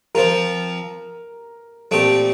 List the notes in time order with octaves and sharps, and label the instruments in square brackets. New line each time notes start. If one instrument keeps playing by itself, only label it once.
[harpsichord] F3 C4 F4 [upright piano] A#4
[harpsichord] A#2 A3 C4 G4 [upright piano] A4